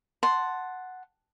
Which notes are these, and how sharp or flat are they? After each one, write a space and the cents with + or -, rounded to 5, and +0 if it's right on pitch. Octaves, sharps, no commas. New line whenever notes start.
F#5 +0 A5 +0 C6 +0